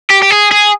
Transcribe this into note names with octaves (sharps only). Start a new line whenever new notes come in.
G4
G4
G#4
G#4